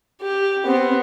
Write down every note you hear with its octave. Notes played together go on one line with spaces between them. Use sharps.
G4
B3 C4